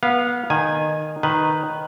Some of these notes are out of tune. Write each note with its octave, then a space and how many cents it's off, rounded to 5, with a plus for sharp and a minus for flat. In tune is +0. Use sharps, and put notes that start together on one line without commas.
B3 -25 F5 +0
D#3 -15 G#5 -5
D#3 -5 B4 +0